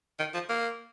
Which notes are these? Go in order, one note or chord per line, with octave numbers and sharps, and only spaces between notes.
D#3
F3
A#3